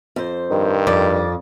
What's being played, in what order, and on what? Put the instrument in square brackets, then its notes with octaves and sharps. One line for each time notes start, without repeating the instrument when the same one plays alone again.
[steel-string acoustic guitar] F2 C5
[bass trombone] G2 [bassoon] D#3
[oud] F2 [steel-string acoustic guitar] D5